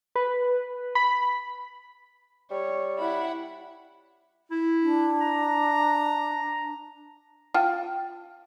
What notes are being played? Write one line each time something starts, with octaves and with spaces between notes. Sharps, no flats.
B4
B5
G3 C#5
E4 F#5 B5
E4
D4
A#5
F4 G5 A5